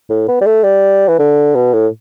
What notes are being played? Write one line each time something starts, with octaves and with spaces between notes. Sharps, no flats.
A2
B3
G3
A3
G3
E3
D3
B2
A2